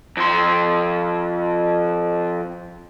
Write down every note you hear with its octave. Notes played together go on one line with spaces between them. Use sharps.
F2 C6